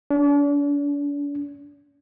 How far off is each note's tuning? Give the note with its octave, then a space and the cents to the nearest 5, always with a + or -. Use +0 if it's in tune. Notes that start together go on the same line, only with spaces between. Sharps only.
D4 -40